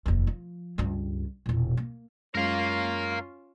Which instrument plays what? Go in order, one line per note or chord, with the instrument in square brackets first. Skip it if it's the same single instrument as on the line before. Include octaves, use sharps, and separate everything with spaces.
[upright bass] F1 D#2
F3
C#2 G2
E1 A#2
A#3
[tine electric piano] F#2 G#3 [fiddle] C#4 F4 [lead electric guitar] A#4 F5